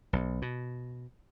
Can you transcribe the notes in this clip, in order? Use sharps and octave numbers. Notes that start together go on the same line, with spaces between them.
B1
B2